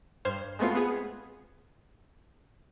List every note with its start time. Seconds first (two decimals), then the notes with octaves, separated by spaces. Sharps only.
0.25 G2 C5 F6 G#6
0.59 G#3 A3 B3 C4 F4
0.75 B3 G#4